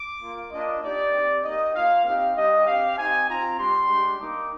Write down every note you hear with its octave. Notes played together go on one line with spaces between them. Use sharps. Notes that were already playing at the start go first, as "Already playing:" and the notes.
Already playing: D6
A#3 F4
A#3 D4 F4 D#5
A#3 D#4 G4 D5
C4 G4
A#3 D#4 G4 D#5
A#3 F4 F5
C4 D#4 G4 F5
G3 D4 G4 D#5
C4 G4 F5
C4 D#4 G4 G#5
C4 F4 A#5
G3 D4 G4 C6
G#3 D4 G4
G3 A#3 D#4 D6